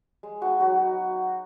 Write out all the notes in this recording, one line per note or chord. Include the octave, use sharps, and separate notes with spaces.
G#3
B3 D#4 F#4
F#3 F#4
B3 D#4